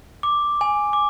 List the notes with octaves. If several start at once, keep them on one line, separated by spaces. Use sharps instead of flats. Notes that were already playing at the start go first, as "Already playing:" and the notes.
D6
G#5
D6